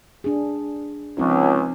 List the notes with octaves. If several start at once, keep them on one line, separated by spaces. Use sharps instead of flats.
D4 G#4
C#2 F3 C4 D#4